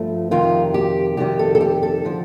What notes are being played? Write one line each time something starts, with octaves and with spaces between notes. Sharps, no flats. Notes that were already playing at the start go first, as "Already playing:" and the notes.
Already playing: G2 F3 A3
F2 C3 D#3 G3 F4
G4
F2 C3 D#3 G3 G4
A4
A4
G4
A4
D3 F3